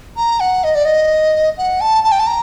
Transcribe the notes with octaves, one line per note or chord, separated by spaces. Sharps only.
A#5
F#5
D#5
D5
D#5
F#5
A5
A5
G5
A5
A#5